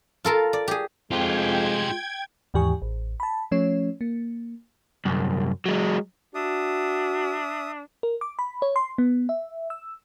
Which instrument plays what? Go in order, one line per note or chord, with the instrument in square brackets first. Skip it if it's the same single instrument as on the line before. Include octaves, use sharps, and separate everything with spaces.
[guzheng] F4 A4 A#4
D5
G4 G#4
[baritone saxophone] F2 [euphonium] G#3 [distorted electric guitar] F4 G4 [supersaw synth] G5 G#6
[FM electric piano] D#2 G#2 E3 G4 G#5 C#6
A1
A5 B5
F3 A3 C#4 C#5
A#3
[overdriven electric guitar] C2 F#2
F#3 G#3
[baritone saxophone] D4 [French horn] F#4 [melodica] E5 D#6
[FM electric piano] A#4
D6
B5
C#5
C6
B3
E5
E6